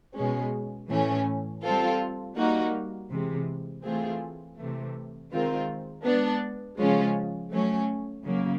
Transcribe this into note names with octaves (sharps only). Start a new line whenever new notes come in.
B2 G#3 C#4
A2 E3 A3 C#4
G3 C4 F4 A4
G3 A#3 D#4 F#4
C3 E3 G#3
E3 A3 C4 F4 G#4
C3 E3 A3
D#3 G#3 C4 F4 A#4
G#3 B3 D4
C#3 F3 G#3 C#4 F4
F#3 A3 C#4
C#3 F#3 A#3